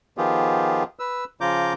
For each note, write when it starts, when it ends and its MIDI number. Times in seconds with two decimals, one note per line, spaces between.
0.18 0.83 51
0.18 0.83 53
0.18 0.83 59
0.18 0.83 65
0.18 0.83 67
0.18 0.83 68
0.99 1.24 71
0.99 1.24 88
1.41 1.73 49
1.41 1.73 53
1.41 1.73 65
1.41 1.73 82
1.41 1.73 86
1.41 1.73 91